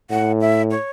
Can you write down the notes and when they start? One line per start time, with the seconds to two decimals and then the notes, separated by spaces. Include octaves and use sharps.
0.10 A2 F#5
0.41 E5
0.71 C#5